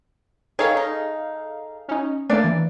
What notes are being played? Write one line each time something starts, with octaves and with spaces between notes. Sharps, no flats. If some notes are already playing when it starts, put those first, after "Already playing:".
D#3 D#4 G#4 A4 C#5 F5
D#4
C#4 D#4
A3 A#3 D4 D5
E3